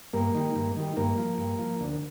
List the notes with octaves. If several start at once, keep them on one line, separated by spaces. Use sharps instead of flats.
G2 A#3
D#3 G3
G2
D#3 G3
G2 A#3
F3
G2
F3
D2